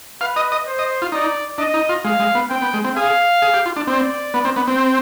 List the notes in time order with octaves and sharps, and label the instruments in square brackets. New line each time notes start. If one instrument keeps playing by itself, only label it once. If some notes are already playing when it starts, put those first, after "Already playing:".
[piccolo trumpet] B4 [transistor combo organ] F5
[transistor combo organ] D#5
D#5
[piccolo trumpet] C5
[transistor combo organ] D#5
F4
[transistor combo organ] D#4 [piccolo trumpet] D5
[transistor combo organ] D4 [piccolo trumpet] D#5
[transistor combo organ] D#4
F4
[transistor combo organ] G#3 [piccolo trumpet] F5
[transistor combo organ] G#3
B3
[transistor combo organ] C4 [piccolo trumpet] G5
[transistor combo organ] B3
G#3
C4
[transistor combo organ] G#4 [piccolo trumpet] F5
[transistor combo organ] G#4
G4
F4
D4
[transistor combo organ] C4 [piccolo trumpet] D5
[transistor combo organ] B3
C4
B3
C4